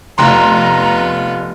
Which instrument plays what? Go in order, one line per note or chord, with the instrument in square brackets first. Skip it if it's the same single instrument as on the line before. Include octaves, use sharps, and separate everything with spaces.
[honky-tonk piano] F1 C6 [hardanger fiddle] B3 F4 [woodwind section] A#5